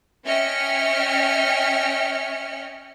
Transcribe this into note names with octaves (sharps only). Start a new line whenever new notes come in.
C#4 D#5 E5 G5 F6 C#7